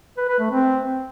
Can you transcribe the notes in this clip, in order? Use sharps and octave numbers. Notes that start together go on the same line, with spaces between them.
B4
B4
A3
C4